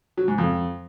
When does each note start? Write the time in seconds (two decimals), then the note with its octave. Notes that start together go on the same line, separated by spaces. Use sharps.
0.17 F#3
0.28 G#2
0.38 F2